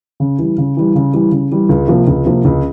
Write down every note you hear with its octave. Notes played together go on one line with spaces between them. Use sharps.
C#3
E3 G3
C#3
E3 G3
C#3
E3 G3
C#3
E3 G3
C#2
C3 F3 A#3
C#2
C3 F3 A#3
C#2